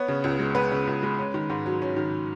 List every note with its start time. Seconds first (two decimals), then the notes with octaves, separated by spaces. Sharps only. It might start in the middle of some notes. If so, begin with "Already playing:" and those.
Already playing: B3 C#5
0.08 C#3
0.24 C#2
0.39 G#3
0.55 B3 B4
0.72 C#3
0.87 C#2
1.03 G#3
1.19 C#4
1.34 D#3
1.50 G#2
1.66 F#3
1.82 C#4
1.96 D#3